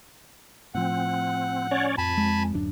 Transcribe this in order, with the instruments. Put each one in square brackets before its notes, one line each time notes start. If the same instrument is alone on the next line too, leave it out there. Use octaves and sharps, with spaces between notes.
[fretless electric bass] A2 F3 [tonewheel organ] C4 [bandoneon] F#5
[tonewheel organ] C#4 C#5 D5
[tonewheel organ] F2 [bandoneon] G#5 A5 B5
[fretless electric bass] G#3
D1 F#2 D4